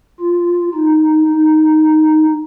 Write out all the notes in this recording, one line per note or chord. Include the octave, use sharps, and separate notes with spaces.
F4
D#4
D#4